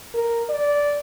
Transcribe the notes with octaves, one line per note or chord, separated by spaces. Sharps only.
A#4
D5